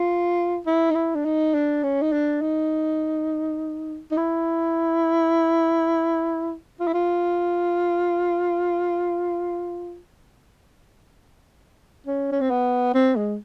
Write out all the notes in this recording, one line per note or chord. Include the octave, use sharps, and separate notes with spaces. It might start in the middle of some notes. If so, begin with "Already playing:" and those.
Already playing: F4
E4
D#4
E4
D4
D#4
D4
C#4
D#4
D4
D#4
D#4
E4
F4
E4
F4
C#4
C#4
C4
B3
C4
G#3